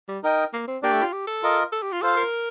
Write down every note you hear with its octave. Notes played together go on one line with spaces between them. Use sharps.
G3
D#4 A#4 D#5 G5
A#3
C4
A#3 D4 G4 D5 G5
A3
F4
G4
A4
F4 A#4 D#5
A4
G4
F4
F4 A4 C5 F5
A#4